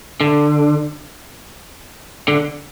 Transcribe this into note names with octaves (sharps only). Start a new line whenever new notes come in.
D3
D3